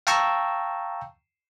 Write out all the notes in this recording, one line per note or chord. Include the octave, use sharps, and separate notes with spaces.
F5 G5 A5 A#5 C#6 E6